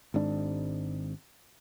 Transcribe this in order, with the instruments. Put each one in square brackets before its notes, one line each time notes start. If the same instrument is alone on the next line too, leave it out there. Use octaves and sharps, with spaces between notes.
[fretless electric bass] G#1 G#2 D4